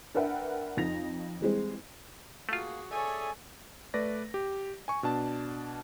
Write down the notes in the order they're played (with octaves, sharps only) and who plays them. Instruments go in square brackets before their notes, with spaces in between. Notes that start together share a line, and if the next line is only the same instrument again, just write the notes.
[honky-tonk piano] D4 A#4 B4 E5 F#5 G5
F2 D#4 F4 A#6 F7
E3 G3 G#3 C4
[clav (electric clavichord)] A3 F4 [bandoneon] A#3 [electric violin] F#4 G#4
[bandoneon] G#4 D5 E5 [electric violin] A4 C#5 [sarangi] G#5
[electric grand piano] A3 B4 D5 A#6
G4
G#5 C#6
B2 D4 A5